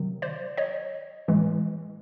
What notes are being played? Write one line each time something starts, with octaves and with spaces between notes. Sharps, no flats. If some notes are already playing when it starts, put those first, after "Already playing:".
Already playing: C3 D#3 F#3
C5 D5
C#5 D#5
A2 E3 G#3